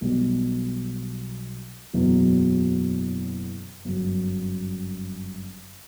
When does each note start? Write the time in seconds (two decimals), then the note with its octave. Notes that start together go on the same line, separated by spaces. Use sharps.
0.01 B1 B2 G3
1.93 F#1 E2 B2 F#3 B3
3.85 G1 F#2 C#3 F#3